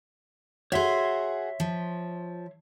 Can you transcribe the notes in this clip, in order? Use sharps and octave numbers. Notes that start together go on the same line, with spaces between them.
F#4 G#4 C#5 E5 C6
F3